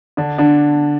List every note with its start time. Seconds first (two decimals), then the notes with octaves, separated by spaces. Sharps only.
0.17 D3 D4
0.38 D3 D4